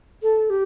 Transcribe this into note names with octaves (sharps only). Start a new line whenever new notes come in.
A4
G4